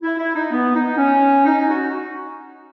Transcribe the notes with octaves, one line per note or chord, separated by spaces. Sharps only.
E4
E4
D#4
B3
D#4
C#4
D#4
F#4